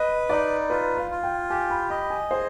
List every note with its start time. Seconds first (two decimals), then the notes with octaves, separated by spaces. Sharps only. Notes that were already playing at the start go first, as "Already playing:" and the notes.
Already playing: B4 D#5
0.30 D#4 D5
0.70 F4 B4
0.97 F5
1.11 F4
1.23 G5
1.50 G4 G#5
1.70 B5
1.90 D#5 B5
2.10 G#5
2.30 G#4 C5